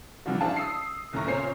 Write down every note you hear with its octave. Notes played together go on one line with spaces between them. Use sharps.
C3 E3 F3 G3 D4 F#4
D4 E4 G#4 C5 F5 A5
D#6 E6 C7
F#1 D#2 A2 E4 A#5 C#6
A#2 C#3 C4 C5 C#5 C7